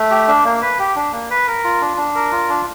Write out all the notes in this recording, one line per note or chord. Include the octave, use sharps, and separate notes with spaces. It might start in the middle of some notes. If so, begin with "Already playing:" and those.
Already playing: A3
G4
D4
A#3
B4
G4
D4
A#3
B4
A#4
F4
D4
D4
A#4
F4
D4